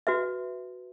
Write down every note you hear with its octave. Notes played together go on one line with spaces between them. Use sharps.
F#4 B4 E5